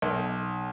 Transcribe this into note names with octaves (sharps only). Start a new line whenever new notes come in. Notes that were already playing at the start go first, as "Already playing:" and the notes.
B1